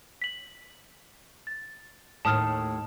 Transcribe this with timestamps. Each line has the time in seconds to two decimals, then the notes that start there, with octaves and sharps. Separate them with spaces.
0.22 B6 F#7
1.47 A6
2.25 D#2 A2 A5 D#6 F6